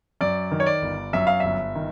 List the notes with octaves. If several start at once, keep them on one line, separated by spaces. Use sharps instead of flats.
F#2 D5
D#3
C#5
D5
G1
F#2 E5
F5
G1 E5
D#3